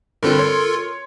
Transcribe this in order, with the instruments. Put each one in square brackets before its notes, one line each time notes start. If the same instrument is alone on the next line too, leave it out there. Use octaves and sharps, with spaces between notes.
[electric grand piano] G2 D3 C4 [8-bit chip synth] F4 A4 A#4
[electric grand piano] C#5 C6